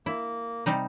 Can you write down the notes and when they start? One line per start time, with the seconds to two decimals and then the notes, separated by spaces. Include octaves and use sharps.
0.06 A#3 E4
0.66 C3 G3 D#4